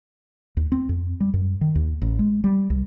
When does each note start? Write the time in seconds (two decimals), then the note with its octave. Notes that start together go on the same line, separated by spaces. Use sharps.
0.57 D#2
0.72 C4
0.89 F2
1.20 G3
1.34 F#2
1.61 D#3
1.75 D#2
2.02 A1
2.19 G#3
2.44 G3
2.70 C2